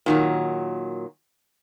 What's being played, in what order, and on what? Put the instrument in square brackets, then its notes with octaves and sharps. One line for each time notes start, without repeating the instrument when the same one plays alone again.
[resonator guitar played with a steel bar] A#2 D#3 F#3